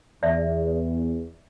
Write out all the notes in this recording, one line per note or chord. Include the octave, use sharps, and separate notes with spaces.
E2 D5 E5